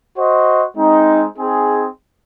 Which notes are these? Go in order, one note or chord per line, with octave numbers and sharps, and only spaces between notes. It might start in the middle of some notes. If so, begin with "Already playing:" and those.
F#4 C5 D#5
G#3 C4 D#4
C4 D#4 G#4